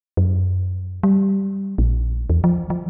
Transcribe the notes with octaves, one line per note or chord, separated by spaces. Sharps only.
F#2
G3
A#1
E2
F3
F3